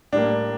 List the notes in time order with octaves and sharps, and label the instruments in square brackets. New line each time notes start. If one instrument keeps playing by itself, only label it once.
[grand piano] A2 G3 A#3 D4